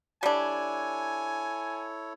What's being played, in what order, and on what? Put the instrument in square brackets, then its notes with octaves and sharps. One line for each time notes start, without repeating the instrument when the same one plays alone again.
[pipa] G3 D4 [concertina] E4 A4 C#5 [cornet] G#5